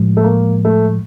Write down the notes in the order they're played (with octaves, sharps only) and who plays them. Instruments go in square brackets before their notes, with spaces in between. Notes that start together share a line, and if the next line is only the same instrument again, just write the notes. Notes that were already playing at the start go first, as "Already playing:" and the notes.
Already playing: [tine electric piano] A2 F3 G#3
[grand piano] A3
A#3
A3